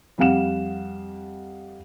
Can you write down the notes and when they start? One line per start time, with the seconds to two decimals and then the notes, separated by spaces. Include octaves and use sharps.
0.18 F2 G3 F5 F#5 E7